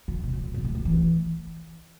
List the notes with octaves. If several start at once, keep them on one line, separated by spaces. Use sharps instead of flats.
C#3
B2
C#3
B2
A#2
G#2
G#2
E3